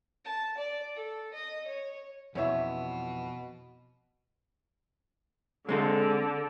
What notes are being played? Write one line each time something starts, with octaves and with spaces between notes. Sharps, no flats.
A5
D5
A4
D#5
C#5
F2 B2 E3 C#4 C#5 E5
D3 G#3 C4 A4